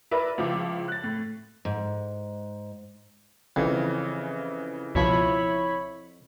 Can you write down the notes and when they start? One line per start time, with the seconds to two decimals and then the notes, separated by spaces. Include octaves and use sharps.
0.11 E4 A#4 B4 D5 E5
0.38 C#2 F3 E4 D6
0.88 F#6 A6
1.04 A2
1.65 G#2
3.56 F2 C#3 E3
4.95 C#2 B2 F3 E4 C#5 B5